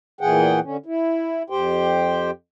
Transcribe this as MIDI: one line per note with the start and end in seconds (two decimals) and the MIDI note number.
0.21 0.60 40
0.21 0.60 46
0.21 0.60 52
0.21 0.60 68
0.21 0.60 78
0.21 0.60 79
0.63 0.77 50
0.63 0.77 61
0.86 1.43 64
1.50 2.31 41
1.50 2.31 67
1.50 2.31 72
1.50 2.31 79